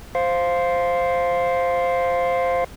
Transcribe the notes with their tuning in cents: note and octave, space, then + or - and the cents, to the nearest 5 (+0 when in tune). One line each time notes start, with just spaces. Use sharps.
C5 +0 F5 +0